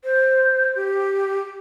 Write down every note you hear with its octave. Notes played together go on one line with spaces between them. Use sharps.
C5
G4